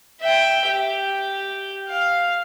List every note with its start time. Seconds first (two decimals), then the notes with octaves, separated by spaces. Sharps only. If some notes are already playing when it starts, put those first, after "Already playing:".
0.20 E5 G5
0.67 G4
1.89 F5